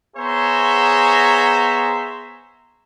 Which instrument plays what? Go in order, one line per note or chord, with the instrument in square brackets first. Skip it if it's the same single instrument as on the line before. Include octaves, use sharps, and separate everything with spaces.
[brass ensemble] B3 G#4 C5 C#5 E5 A#5